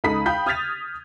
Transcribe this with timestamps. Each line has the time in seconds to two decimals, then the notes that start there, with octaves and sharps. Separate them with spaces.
0.04 C#2 D#4 A4 B5 D#6 B6
0.26 F5 G5 B5 G6 B6
0.46 D#6 F6 G#6 A6 B6 F7